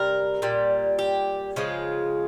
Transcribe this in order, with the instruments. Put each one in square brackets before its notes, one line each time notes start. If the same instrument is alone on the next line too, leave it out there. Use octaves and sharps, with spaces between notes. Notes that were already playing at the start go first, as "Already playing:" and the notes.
Already playing: [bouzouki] C3 G3 A#4
A#2 G3
G4
C#3 F3 G#3 F4